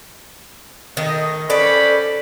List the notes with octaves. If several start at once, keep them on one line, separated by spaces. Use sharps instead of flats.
D#3 A3 D#5
C#4 A4 B4 C5 D5 B5